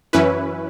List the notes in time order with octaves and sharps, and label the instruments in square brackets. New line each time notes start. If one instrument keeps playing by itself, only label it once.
[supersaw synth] F#2 E3 C#4 E4 B4